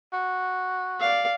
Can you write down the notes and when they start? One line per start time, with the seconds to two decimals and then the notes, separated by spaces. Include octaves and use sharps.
0.13 F#4
1.00 D5 F5